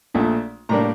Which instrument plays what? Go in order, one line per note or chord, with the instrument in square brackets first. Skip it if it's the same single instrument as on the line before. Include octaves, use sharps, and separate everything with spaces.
[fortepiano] A#1 A#2 A3
A2 G3 A#3 D4 A#5